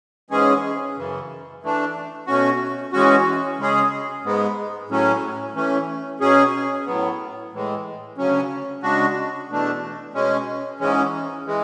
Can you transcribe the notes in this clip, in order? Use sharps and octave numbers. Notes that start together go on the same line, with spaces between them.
G#2 E3 G#3 C#4 G#4
F#2 C#3 E3
E3 A3 D4
B2 A3 C#4 F#4
E3 G#3 C#4 F#4
C#3 G#3 C#4 G#4
G#2 G#3 B3
A2 F#3 C#4
E3 A3 C#4
B2 F#3 C#4 G#4
A2 F#3 B3
A2 E3 G#3
D2 C#3 F#3 C#4
C#3 G#3 D4 F#4
E2 B2 A3 D4
B2 G#3 C#4
G#2 E3 G#3 C#4
E3 G#3